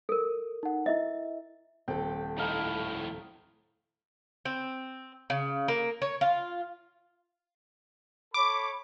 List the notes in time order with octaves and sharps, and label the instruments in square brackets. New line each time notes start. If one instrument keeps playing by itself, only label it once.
[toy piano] A4 A#4
[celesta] D#4 F#5
[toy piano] E4 D#5 [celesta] E5
[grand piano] D#1 [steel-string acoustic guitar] C4 A4 [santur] G5
[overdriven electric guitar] F2 A2 [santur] D#4 F5 B5
[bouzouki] C4
C#3
A#3
C#5
F4
[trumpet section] A4 C#5 B5 [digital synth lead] D6